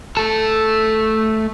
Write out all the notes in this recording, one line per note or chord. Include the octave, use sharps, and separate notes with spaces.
A3 A4